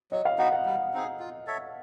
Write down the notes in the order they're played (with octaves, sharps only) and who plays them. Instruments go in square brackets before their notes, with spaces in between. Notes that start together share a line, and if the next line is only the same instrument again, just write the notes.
[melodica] F#3 [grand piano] D#5
[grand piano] F5
[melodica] B3 D#4 F#4 [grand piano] F#5
[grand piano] F#5
[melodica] G3
C4 D#4 G#4
F4
A4 C#5 E5